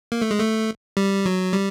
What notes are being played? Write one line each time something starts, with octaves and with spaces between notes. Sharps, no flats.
A#3
A3
G#3
A3
G3
F#3
G3